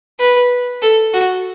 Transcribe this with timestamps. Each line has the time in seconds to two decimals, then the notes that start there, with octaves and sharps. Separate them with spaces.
0.19 B4
0.82 A4
1.13 F#4